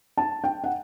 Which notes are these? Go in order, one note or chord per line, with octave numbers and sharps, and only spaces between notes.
A5
G5
F#5